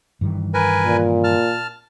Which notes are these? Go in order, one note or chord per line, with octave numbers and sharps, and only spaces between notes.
G2 D#3 E3
A#4 B4 G#5
A#2
A5 F6